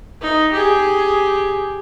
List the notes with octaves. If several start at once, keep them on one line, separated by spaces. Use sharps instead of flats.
D#4
G4 G#4